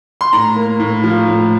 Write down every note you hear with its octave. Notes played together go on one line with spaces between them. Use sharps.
C6
A2 A#5
A#3
A2
F3
A2